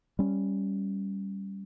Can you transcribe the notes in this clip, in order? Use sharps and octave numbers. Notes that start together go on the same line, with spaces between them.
G3 C#4